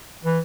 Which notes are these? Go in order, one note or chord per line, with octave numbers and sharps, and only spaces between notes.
E3